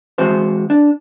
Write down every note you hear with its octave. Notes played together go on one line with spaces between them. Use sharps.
E3 G#3 C4 F#4 C5
D4